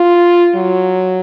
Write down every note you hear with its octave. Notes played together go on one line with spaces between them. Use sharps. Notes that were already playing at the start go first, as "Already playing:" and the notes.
Already playing: F4
F#3